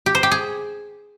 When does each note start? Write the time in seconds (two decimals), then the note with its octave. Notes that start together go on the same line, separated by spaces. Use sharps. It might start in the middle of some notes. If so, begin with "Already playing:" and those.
0.06 G4
0.15 C5
0.23 G4
0.31 G#4